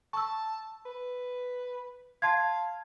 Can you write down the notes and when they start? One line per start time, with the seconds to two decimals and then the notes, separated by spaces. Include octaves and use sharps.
0.13 A5 C#6 E6
0.85 B4
2.22 F5 A5 C6 G#6